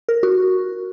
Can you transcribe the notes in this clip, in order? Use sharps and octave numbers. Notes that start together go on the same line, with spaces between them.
A#4
F#4